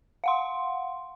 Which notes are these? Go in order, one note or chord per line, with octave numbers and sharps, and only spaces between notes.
F5 F#5 C6